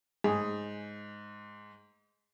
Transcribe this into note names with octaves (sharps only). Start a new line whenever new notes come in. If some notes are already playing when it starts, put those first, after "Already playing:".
G#2 G#4